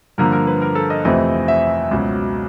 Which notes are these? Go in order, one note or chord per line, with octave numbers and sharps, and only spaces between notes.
G2 D3 F3 A#3 A#4
A#4
B4
A#4
A4
D#5
F2 C3 E3 A3 C4 D#5
E5
C#2 B2 F#3